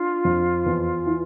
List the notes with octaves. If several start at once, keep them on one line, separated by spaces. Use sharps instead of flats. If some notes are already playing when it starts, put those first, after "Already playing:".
Already playing: D4 F4
F2
E2
E3